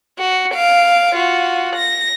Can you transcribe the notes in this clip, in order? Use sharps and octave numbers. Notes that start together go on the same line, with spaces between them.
F#4
F5 D7
F4 F#4
A#6